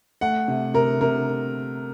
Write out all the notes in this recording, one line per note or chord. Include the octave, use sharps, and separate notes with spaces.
A3 F#5
C3
C3 A#4
C3 A#4